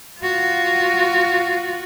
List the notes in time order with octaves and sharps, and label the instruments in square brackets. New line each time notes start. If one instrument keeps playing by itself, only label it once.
[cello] F4 F#4